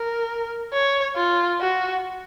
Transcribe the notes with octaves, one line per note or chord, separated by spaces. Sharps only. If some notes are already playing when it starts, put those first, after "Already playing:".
Already playing: A#4
C#5
F4
F#4